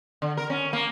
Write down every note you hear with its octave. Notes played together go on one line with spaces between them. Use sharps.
D3
A#4
C#4
A#3